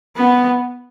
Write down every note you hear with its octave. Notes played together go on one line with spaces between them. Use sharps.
B3